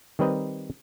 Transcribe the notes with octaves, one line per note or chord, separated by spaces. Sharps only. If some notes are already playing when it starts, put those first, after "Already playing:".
D#3 G3 C4 B4 D#5 A#5